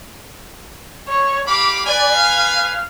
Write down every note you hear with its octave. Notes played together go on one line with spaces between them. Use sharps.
C#5
G4 F5 B5 D6
B4 D5 G#5
F5